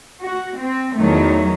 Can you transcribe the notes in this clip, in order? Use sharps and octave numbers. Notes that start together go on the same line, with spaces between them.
F#4
C4
E2 D#3 F#3 A3